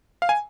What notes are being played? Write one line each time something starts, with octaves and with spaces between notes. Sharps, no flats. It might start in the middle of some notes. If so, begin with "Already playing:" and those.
F5
G#5